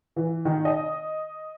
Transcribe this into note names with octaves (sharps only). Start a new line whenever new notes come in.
E3
D#3
D#5